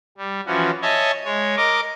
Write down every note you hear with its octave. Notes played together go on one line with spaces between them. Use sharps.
G3
E3 F3 C#4 F#4
C#5 D#5 E5 G#5 A5
G#3 C#5
A#4 D#5 D6